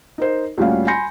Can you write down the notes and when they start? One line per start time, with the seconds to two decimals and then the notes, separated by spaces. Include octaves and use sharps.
0.18 D#4 A#4 C5
0.58 D2 A#2 G3 C#4 F5
0.87 G#5 B5 C6 G6 A#6 C#7